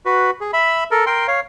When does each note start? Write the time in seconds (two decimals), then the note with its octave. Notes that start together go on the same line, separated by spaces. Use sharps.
0.06 F#4 B4
0.41 G#4
0.53 E5 B5
0.91 A4 A#4
1.06 A#4 G5 C6
1.28 C#5 F5